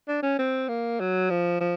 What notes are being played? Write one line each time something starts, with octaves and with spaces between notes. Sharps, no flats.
D4
C#4
C4
A#3
F#3
F3
F3